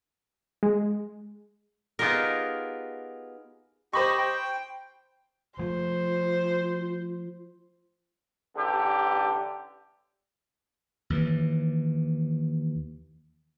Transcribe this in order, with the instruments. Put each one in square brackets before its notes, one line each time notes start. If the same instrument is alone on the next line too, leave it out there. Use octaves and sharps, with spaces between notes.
[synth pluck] G#3
[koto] B3 D#4 F4 G4 G#4 A#4
[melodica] G4 D#5 [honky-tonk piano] C5 B5 C#6
[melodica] G5
[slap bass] F3 A3 [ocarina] F4 [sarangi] C5
[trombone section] A1 D3 G4
[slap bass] D#2 E3